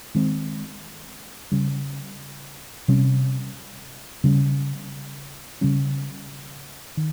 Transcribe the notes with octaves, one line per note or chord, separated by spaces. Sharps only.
D#3 G#3 C4
C#3 G3 C#4
C3 G3 C#4
C#3 G3 C#4
C#3 G3 C#4
D#3